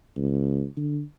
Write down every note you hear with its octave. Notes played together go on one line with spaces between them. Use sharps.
C#2
D3